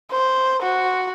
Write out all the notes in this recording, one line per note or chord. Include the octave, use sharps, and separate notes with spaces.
C5
F#4